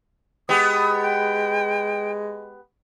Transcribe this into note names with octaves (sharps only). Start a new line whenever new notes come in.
G#3 B3 G4 D#6
G5